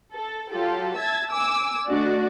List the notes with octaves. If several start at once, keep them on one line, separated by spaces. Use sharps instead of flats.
A4
F#3 F4 G4 A4
E5 A5 E6 G#6
G#5 D6 E6
A3 D4 F#4 D5 D#5